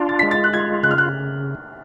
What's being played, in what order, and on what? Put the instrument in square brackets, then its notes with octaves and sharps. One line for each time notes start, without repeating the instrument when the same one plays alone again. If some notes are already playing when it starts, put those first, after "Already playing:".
Already playing: [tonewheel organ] D4 F4
[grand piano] A6
[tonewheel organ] G#3 [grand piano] B6
[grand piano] A6
F#6
[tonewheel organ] F4 [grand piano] G#6
[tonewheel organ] C#3 [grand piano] F#6
[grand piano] F6
F#6